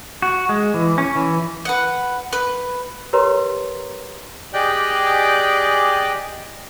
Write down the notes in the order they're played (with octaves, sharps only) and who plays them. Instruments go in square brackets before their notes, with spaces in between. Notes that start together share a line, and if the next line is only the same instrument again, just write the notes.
[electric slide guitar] F#4
G#3
E3
C#4
E3
[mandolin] B4 F#5
B4
[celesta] G4 A#4 B4 C#5 A#5 C6
[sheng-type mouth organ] G4 G#4 D5 D#5 G5 F#6